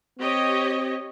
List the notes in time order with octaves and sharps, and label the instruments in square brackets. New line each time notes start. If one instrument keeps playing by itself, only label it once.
[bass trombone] C4 [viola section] G4 C#5 D#5